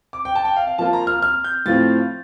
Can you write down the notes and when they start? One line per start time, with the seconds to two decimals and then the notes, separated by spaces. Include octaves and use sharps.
0.13 D6
0.25 G5
0.35 A5
0.45 G5
0.56 F5
0.67 F5
0.78 F3 A#3 F4 A5
0.93 A#5
1.07 F6
1.22 F6
1.44 G6
1.66 A2 F3 C4 F4 A6